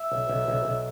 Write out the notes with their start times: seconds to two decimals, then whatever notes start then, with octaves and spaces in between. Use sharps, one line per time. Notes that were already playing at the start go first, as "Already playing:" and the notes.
Already playing: E5
0.12 B1
0.30 B1
0.48 B1
0.65 B1